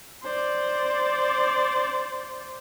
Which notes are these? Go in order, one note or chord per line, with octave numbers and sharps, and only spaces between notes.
C5 D5